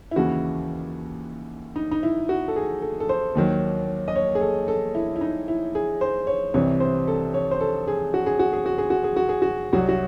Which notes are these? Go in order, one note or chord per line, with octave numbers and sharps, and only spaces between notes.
E4
D#2 C#3 E3 F#4
D#4
D#4
E4
F#4
A4
G#4
A4
A4
C5
D#2 D#3 F#3
D#5
C#5
G#4
A4
A4
E4
E4
D#4
E4
G#4
C5
C#5
C2 C3 E3 C#5
C5
A4
C#5
C5
A4
G#4
F#4
G#4
F#4
G#4
F#4
G#4
F#4
G#4
F#4
G#4
F#4
C2 C3 F#3 F#4
F#4